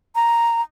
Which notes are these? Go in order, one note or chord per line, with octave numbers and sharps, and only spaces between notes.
A#5